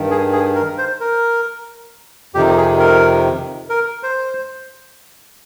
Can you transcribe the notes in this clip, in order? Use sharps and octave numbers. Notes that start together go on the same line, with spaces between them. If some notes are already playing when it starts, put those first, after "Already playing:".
Already playing: G2 D#3
G#4
G#4
A#4
C5
A#4
F2 C3 D#3 G4
G#4
A#4
A#4
C5